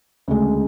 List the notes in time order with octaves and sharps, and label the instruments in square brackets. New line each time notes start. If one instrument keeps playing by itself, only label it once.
[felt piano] D2 C#3 G#3